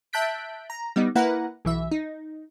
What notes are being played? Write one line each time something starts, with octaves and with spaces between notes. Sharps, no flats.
E5 A5 F#6 G6 B6 D7
A#5
G3 B3 D#4
A#3 E4 B4 F#5 A#5
B1 E3 E5
D#4